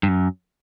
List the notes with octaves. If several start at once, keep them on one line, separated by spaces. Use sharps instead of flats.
G2
F#2